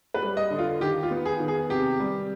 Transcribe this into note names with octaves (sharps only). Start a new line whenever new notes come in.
B4
G3
D#5
D3
F4
D#3 G4
F4
B3
G#4
D#3
G#4
C3 G4
G3